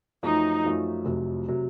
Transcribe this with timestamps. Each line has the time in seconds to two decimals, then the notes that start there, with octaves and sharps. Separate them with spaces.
0.23 F#2 F3 A3 D#4
0.64 F#2 F3 A3
1.05 F1 F2 C3 F#3
1.48 C3 F#3